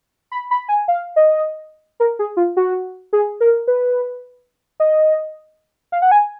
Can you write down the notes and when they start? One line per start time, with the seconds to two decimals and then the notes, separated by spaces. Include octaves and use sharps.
0.32 B5
0.51 B5
0.69 G#5
0.88 F5
1.16 D#5
2.00 A#4
2.19 G#4
2.37 F4
2.57 F#4
3.13 G#4
3.41 A#4
3.68 B4
4.80 D#5
5.92 F5
6.02 F#5
6.11 G#5